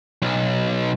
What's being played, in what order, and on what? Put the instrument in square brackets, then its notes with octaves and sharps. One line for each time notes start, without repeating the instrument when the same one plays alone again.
[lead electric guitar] B1